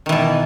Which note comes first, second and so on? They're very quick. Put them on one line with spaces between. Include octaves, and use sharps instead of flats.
D#3 E3 B2